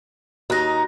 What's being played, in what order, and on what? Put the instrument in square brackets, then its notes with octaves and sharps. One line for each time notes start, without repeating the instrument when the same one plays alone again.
[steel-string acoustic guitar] D#2 D#4 [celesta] F#4 F#6 A#6